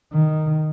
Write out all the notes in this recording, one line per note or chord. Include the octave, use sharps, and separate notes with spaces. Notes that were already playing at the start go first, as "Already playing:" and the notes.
D#3